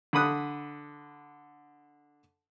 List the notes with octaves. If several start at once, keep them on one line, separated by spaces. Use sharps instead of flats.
D3 B5 D#6 F#6